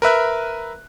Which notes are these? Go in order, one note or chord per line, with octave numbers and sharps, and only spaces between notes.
A#4 B4 E5 F#6